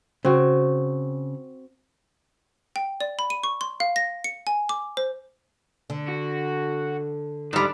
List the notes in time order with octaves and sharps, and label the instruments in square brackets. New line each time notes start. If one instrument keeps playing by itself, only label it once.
[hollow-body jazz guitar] C#3 [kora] C4 F#4
[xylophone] G5
D5
B5
D#7
C#6
C6
F5
A#6
C#7
G#5
D6
C5
[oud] D3
[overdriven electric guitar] F#4
[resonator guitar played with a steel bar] G#2 G3 [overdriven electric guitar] D4 D5